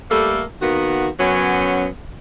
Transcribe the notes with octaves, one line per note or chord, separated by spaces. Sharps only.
G3 A3 A#3 A4
D#3 A#3 B3 F#4
F#2 F#3 B3 C#4